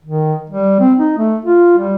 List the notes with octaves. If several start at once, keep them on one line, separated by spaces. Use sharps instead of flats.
D#3
G3
C4
D#4
A3
F4
G3